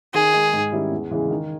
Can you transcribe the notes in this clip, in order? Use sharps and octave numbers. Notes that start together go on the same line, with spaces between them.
D#3 G#4
G#3 D#4
G#2
D#3 G3 C#4 E4
E2
C#3 E3 G#3
D#3